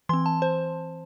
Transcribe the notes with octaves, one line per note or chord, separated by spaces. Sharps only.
E3 C4 C6
A5
C5